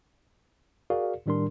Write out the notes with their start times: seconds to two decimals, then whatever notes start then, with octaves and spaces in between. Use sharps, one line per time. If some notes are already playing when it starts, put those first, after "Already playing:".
0.90 F#4 G#4 A#4 D5 F5
1.26 A2 D#3 G3 D4 A#4 C6